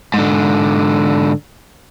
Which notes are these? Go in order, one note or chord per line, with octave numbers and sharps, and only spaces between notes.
G#2 D3